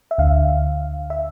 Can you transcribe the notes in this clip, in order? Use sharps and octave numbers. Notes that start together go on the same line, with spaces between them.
E5
D2 D3 F5
E5